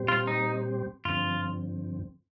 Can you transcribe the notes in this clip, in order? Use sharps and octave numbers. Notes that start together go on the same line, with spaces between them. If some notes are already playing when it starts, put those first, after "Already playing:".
Already playing: A#2 G3 C4 G4 C5
F4
D#4
G2 D3 F3 C4 F4